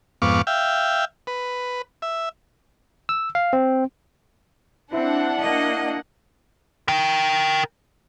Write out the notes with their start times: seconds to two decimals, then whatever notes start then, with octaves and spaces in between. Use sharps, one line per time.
0.22 F2 G#2 B3 F5 C#6 D6
0.47 E5 F5 G5
1.27 B4
2.02 E5
3.09 E6
3.35 F5
3.53 C4
4.93 C4 D4 E4 E5 F#5
5.39 A#3 D#5
6.88 A#4 G5